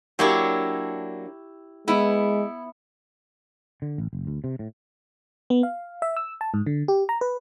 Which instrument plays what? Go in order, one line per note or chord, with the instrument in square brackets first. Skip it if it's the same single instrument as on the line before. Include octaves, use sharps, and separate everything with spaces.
[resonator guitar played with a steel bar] F#3 A#3 D4 [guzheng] E4 G4 C#5
[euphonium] G#3 [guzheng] B3 [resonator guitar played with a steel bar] E4
[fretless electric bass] D3
A1
F#1
D2
C3
A2
[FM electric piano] B3
F5
E5
E6
A5
G#2
D3
G4
A#5
B4